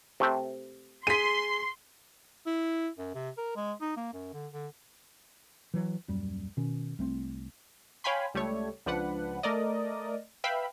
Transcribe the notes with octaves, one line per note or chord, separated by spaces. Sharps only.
C3 A3 C4
G#4 C6 B6 D#7
E4
F#2
C3
A#4
G#3
D#4
A#3
F#2
D3
D3
E3 F#3
D#1 F#2 G3
B2 D#3 C#4
C2 A3 C4
C#5 F5 G5 G#5 B5 C6
C#2 G3 A3 C#5
C#2 F3 D4 B4 F#5
A3 A#4 D5 D#5
B4 E5 F5 G5 B5